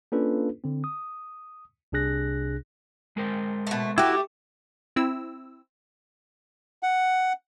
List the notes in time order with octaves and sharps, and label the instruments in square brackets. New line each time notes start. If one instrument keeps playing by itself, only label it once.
[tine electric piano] A#3 C#4 D4 F4 A4 B4
D3 C4
D#6
C2 C3 D4 G#4 F#6 A#6
[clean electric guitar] G#3 A#4 C5
[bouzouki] B2 A3
[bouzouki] A3 G4 [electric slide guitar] E4 F#4
[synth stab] C4 E4 E6
[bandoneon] F#5